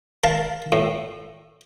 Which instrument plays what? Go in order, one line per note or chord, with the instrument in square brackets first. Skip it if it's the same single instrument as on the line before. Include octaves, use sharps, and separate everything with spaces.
[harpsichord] A#4 F5 A5
A2